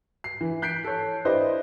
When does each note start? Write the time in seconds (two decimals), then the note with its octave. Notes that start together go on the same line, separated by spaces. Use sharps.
0.24 C7
0.41 E3
0.62 F#6 G6 B6 C7 D7
0.85 A4 C#5
1.25 D4 E4 G4 B4 C5 D#5